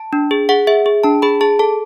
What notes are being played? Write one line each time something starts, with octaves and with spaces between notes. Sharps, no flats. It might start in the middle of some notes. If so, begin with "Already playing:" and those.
Already playing: A5
D4
G#4
G#4 F#5
G#4 E5
G#4
D4 A5
G#4 B5
G#4 A5
A4 A5